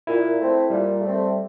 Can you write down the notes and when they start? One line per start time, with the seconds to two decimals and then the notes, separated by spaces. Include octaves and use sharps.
0.07 A#2 E4
0.39 A3 C4
0.70 A#2 G3
1.01 A3
1.07 C4